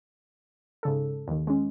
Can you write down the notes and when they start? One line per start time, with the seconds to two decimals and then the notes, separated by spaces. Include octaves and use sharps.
0.83 G#2 C#3 A4
1.28 D#2 D#3
1.47 G#3 C#4